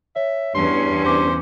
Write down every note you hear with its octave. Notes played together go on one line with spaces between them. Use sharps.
C#5 E5
E2 G2 C#4 C6
B4 C5 D6